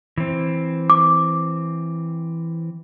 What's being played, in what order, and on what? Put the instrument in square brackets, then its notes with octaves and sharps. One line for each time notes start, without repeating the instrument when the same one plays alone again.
[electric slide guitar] E3 C4
[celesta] D6